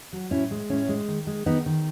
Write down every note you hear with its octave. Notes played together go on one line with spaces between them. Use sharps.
F#3
A2 C#4 E4
G#3
A2 C#4 E4
G#3
D#3
G#3
D#3 B3 D#4
D#3